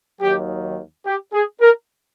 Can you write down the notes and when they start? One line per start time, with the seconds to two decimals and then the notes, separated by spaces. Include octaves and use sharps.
0.21 D#2 D#3 F#3 G4
1.06 G4
1.33 G#4
1.61 A#4